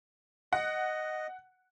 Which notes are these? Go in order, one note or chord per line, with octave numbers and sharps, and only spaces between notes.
D#5 F#5